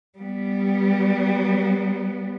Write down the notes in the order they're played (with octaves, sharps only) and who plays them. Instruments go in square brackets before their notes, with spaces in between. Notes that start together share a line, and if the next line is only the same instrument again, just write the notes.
[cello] G3 B3